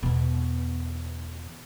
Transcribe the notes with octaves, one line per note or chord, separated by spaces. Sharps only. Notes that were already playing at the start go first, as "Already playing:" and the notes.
E2 B2